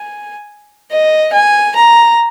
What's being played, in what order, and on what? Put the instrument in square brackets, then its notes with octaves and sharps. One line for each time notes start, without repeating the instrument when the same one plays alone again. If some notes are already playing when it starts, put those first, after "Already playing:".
Already playing: [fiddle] G#5
D#5
G#5
A#5